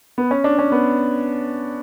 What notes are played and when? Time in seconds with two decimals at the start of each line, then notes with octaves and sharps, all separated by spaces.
0.18 B3
0.31 C#4
0.44 D4
0.59 C#4
0.72 B3